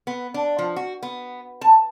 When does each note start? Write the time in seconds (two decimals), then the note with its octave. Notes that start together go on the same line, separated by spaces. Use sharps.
0.07 B3
0.34 D4
0.59 F3
0.76 F#4
1.03 B3
1.61 A5